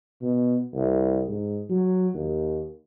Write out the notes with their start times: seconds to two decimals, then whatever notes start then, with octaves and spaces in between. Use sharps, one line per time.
0.21 B2
0.73 C2
1.28 G#2
1.70 F#3
2.14 D#2